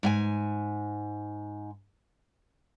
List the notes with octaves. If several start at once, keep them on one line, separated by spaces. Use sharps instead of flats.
G#2 G5 G#5